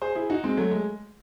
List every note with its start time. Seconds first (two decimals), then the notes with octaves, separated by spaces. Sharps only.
0.02 G#4 C5
0.15 E4 G#4
0.30 D#4 F#4
0.44 G#3 C4
0.57 F#3 A3
0.71 G#3